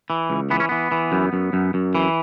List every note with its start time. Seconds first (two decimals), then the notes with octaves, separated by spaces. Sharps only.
0.10 E3
0.30 C#2
0.50 E3 B3
0.60 C#4
0.69 E3 B3
0.92 E3
1.12 F#2
1.33 F#2
1.53 F#2
1.74 F#2
1.95 E3